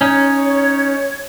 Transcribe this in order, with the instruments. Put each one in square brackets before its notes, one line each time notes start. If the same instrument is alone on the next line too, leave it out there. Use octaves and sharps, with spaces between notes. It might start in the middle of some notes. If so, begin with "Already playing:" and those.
[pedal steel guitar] C#4 D#4 [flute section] C#5